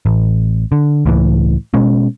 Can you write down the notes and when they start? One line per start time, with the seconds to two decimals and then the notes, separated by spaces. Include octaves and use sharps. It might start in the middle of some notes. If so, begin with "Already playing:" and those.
0.06 A1
0.72 D3
1.06 C#2 A2 E3
1.74 B2 G#3 C#4